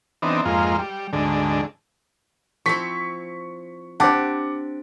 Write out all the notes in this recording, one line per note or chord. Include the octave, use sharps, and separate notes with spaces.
E3 B3 C4 D4 D#4
F2 G#2 A#3 F4
G3
D2 G#2 D3
F3 C4 E4 C#6 B6
C4 D4 G4 C5 F#5 A5 D6